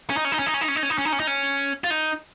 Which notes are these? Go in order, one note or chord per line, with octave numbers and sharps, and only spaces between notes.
C#4
D#4
C#4
D#4
C#4
D#4
C#4
D#4
C#4
D#4
C#4
D#4
C#4
D#4
C#4
D#4
C#4
F4
D#4